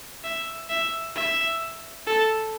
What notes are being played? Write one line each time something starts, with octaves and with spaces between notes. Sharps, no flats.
E5
E5
E5
A4